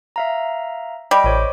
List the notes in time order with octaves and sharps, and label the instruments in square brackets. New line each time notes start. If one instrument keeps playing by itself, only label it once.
[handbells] E5 F5 A#5
[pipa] G3 [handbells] D#5 B6 D7
[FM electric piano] A1 [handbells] C5 C#5 D6